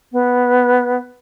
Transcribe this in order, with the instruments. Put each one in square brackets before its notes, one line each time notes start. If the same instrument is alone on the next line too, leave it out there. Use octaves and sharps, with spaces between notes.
[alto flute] B3